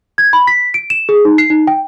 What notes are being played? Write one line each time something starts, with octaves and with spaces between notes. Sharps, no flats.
G#6
B5
B6
D7
E7
G#4
D#4
C7
D#4
G5